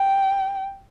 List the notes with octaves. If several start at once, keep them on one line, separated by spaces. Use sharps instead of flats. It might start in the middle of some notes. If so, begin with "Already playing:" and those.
Already playing: G5